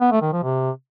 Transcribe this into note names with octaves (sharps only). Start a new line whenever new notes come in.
B3
A3
D#3
F3
C3